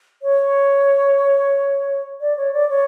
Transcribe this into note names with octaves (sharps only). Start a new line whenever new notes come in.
C#5
D5
C#5
D5
C#5